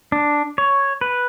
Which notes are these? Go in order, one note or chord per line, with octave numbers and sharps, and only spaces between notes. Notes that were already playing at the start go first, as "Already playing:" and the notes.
D4
C#5
B4